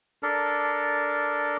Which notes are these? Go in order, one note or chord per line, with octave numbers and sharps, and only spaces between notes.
D4 A4 A#4